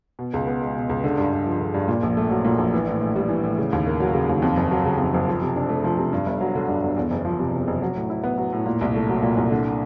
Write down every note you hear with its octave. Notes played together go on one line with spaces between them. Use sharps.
B2
C#2
B3
G#3
B2
C#2
D3
G2
G2
F3
D3
G2
A#2
A#1
A3
F#3
A#2
A#1
E3
A2
A2
G3
E3
A2
C#3
D#2
A#3
F#3
C#3
D#2
F2
F#1
F#3
C#3
F2
F#1
F3
C3
D4
A3
F3
C3
G2
G1
F#3
D3
G2
G1
E2
F#1
F3
C3
E2
F#1
F#3
A2
E4
B3
F#3
A2
A#2
C2
A3
F#3
A#2
C2
D3